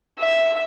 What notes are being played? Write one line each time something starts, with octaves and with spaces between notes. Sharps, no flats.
E5